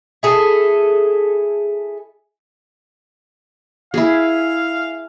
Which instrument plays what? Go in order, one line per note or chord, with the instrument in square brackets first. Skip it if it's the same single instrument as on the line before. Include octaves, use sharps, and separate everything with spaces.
[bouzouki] E4 G#4 A4
[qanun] E4 G#4 [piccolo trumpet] F5